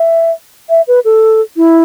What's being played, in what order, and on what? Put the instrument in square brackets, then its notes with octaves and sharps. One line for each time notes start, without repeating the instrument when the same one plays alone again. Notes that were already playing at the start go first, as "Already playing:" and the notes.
Already playing: [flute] E5
E5
B4
A4
E4